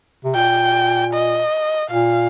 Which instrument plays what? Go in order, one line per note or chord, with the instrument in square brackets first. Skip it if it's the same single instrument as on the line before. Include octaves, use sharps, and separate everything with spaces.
[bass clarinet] C3
[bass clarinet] A#2 [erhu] G5
[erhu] D#5
[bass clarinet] A#2 [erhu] F5